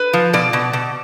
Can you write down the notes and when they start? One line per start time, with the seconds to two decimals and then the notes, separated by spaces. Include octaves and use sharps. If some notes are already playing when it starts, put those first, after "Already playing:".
Already playing: B4
0.13 F3
0.33 B2 D5
0.53 B2
0.73 B2